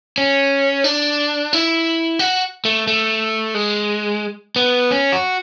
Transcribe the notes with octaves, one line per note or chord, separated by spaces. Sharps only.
C#4
D4
E4
F#4
A3
A3
G#3
B3
C#4
F#4